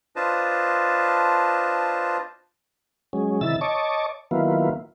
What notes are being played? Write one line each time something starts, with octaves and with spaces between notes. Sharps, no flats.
D4 F4 B4 C5 D#5 A5
F#3 G#3 C#4
C3 D#3 E4 E6 A6
C#5 D#5 A5 C#6 D6
D#3 F#3 A#3 B3 E4 F4